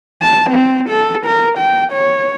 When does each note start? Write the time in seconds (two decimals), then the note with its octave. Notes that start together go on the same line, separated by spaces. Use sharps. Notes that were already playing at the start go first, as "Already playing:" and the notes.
0.22 A5
0.50 C4
0.89 A4
1.26 A#4
1.58 G5
1.92 C#5